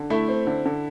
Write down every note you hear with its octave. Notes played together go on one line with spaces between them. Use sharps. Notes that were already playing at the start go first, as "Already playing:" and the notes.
Already playing: D3
A3 E4
C4
D3
D3